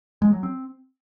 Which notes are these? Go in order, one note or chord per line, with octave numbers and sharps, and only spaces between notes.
G#3
F#3
C4